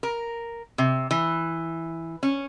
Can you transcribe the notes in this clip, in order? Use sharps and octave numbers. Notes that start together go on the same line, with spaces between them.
A#4
C3
E3
C#4